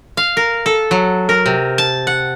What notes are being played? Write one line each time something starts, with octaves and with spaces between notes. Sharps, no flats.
F5
A#4
A4
F#3
A#4
C3
A5
F#5